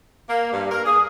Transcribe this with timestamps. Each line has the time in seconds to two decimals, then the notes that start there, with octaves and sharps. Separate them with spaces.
0.29 A#3
0.52 G2
0.71 A#3 A#4
0.85 G#4 D#6